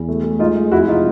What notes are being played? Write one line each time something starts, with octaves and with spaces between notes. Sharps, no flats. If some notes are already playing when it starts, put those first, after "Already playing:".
Already playing: E2
A3
A3
G#3 D#4 F4
G#3
F2 E4 F#4
C3 D#4 F4